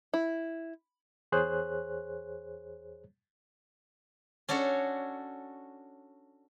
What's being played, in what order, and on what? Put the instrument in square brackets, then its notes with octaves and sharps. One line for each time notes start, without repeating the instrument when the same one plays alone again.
[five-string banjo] E4
[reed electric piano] E2 G#4 C5 C#5 F#6
[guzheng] C#4 D4 F#4 A4 C#5